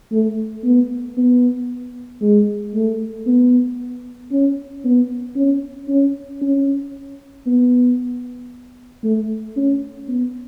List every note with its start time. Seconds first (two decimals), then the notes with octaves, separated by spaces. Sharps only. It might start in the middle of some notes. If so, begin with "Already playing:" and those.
0.12 A3
0.64 B3
1.17 B3
2.22 G#3
2.75 A3
3.27 B3
4.31 C#4
4.85 B3
5.36 C#4
5.89 C#4
6.42 C#4
7.47 B3
9.04 A3
9.56 C#4
10.08 B3